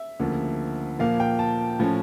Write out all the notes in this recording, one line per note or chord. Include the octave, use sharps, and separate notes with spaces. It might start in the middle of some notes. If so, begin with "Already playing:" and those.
Already playing: E5
D2 C#3 F3 A#3
A#2 F3 A#3 F5
G5
A5
A2 F3 C#4